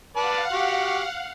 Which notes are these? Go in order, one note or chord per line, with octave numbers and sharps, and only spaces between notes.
B4 D5 F5 F#5 A5
F#4 G4